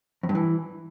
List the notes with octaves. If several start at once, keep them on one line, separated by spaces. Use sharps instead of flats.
F2
G2
E3